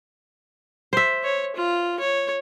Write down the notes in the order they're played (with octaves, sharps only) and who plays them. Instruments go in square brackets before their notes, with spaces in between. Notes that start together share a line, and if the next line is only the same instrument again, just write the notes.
[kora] C5 E5
[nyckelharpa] C#5
F4
C#5